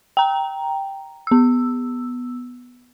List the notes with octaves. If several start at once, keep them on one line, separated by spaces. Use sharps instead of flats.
G5 A#5
B3 E6